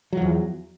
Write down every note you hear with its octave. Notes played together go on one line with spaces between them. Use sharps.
E2 F3 F#3